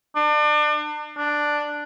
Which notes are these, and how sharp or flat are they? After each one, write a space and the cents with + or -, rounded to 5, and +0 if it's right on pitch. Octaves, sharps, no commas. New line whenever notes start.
D4 +35
D4 +5